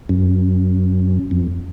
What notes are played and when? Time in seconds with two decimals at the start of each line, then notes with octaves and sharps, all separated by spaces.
0.09 F#2
1.31 F2